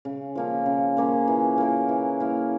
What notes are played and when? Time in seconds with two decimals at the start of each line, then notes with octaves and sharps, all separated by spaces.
0.05 C#3
0.35 F3 A#3 C#4
0.66 C#3
0.97 F3 A#3 C#4
1.28 E3
1.58 A#3 E4 A#4
1.89 E3
2.20 A#3 E4 A#4